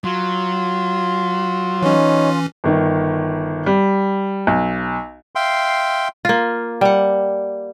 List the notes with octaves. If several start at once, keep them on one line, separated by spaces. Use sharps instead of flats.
F#3 F4
E3 C#4 D#4 C#5
G1 D#3
G3
B1
E5 F5 G5 C6
A#3 F4
G3 F#5